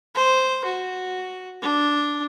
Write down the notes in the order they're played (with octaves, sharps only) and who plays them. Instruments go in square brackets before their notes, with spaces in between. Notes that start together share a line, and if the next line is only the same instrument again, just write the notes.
[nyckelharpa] C5
F#4
D4